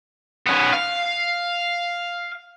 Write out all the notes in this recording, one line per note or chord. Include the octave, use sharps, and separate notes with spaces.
B3 C#4
F5